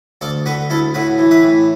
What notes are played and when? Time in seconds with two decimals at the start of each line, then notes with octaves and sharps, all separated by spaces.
0.21 D2 A4 D5
0.46 D3 F#4 B4
0.70 D2 E4 A4
0.94 A2 F#4 B4
1.18 E3
1.31 B4 E5
1.43 A2